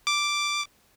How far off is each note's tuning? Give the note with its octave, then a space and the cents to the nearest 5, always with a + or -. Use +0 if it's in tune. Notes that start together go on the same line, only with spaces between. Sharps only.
D6 +0